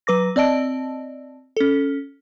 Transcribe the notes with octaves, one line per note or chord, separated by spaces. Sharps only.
F#3 B4 D6 A#6
C4 D5 D#5 A5 D7
C#4 A4